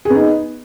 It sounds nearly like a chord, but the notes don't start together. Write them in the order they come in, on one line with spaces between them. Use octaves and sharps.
G#4 B3 D#4